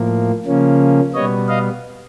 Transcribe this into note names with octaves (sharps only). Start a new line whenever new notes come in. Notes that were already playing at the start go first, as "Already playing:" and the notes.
Already playing: A2 F3 A#3
C#3 F3 A#3 C#4
B2 G3 B3 C#5 D#5
D#5 F5